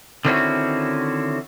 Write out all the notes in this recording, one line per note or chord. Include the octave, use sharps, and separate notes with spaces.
D3 D#3 C4 C#4 E4 F#4